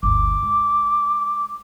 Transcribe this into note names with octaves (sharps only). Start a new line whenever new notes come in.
G1 D2 D6
G#3